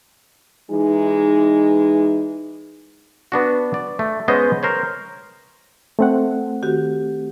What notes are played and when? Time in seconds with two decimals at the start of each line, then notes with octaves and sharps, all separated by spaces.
0.71 E3 G#3 D#4
3.32 B3 D4 F#4
3.74 D5
3.99 A3
4.28 G#3 B3 C#4 C5 D#5
4.63 A#4 C5 C#5
5.99 A3 C4 F#5
6.63 D#3 F#4 G4